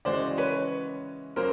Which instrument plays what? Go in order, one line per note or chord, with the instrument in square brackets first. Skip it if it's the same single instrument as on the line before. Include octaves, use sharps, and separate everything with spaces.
[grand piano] C#3 E3 G#3 C#4 F#4 [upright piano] C5 D5
[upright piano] B4 C#5
[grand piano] F#3 A#3 C#4 [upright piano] A#4 C5